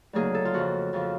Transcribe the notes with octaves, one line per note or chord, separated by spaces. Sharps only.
D2 C#3 F#3 A#3 D#4 G#4
A4
F4
F2 C#3 F3 F#4
F2 C#3 F3